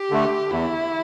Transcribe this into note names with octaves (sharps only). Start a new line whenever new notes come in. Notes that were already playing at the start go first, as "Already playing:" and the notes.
Already playing: G4
D3 A3
E2 E4